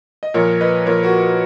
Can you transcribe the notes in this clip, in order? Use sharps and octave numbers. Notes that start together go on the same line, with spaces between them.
D#5
A#2 F3 A#4 C#5
B4 D#5
A#2 F3 A#4 C#5
F#4 A#4